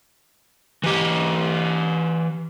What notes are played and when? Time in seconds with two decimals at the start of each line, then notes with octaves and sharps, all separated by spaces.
0.83 E3 G4